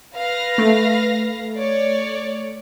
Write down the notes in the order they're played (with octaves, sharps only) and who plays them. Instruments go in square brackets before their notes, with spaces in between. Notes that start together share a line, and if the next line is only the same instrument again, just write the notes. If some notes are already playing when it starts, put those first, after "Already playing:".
[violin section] B4 F5 A#6
[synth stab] A3
[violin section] C#5 D5